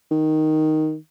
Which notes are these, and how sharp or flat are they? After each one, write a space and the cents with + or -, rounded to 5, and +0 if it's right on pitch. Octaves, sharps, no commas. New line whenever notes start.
D#3 +0